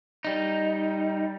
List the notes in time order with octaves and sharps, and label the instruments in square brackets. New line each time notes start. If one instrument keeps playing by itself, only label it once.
[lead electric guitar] G3 D#4